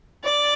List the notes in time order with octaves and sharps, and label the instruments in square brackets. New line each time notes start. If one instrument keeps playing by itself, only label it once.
[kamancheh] D5